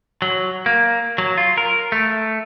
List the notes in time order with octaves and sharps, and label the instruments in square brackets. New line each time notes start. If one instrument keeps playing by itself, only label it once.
[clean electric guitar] F#3
A#3
F#3
F4
A#4
A3